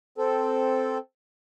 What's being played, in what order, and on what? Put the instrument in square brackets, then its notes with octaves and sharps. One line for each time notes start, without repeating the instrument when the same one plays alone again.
[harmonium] C4 A4